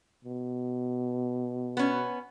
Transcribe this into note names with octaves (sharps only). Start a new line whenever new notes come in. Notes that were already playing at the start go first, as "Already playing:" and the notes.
B2
B3 C#4